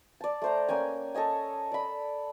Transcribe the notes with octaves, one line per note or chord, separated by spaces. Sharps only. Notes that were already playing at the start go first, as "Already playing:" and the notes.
D5 A5
A3 C5 A#5
A#3 C#4 G5 G#5
A4 C#5 D#5 G#5
D5 B5